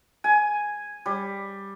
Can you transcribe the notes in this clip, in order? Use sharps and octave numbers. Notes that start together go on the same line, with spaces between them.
G#5
G3